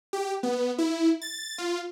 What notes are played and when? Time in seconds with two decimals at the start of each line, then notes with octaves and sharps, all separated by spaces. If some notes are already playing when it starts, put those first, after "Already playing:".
0.13 G4
0.43 B3
0.78 E4
1.22 A6
1.58 F4